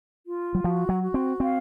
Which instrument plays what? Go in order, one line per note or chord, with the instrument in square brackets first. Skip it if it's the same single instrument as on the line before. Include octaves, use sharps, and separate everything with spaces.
[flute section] F4
[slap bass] F#3
[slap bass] F3 [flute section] F#4
[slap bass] F#3
[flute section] F#4
[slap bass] C4
[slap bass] C4 [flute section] F5